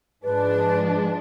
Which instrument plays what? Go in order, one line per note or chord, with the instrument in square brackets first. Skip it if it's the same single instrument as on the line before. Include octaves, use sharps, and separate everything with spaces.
[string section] G#2 F3 G#3 D4 [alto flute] B4